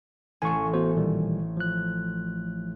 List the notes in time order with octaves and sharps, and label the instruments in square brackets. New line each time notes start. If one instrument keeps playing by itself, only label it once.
[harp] A1 A3 [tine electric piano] G#5 C#6
[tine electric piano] B3 F#4 C5
A#2 D#3 G3
F3 F#6